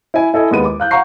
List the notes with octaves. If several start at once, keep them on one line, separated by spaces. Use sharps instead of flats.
E4 G#5
E4 A4 D#5 G#5
D#2 G#3 B3 D#7
D6
F5 F#6 G6
F5 F#5 A#5 C#6 C7